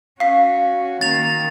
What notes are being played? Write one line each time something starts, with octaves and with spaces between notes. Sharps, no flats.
C#4 F#4 F5 B6
D#3 A#3 A6 F7